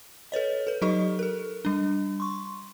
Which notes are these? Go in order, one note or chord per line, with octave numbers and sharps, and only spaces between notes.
A4 B4 C#5 D#5
A4 B4
F#3 D#4 G4 A4 D#5 C#6
A4 A#4
G3 D4
C6 C#6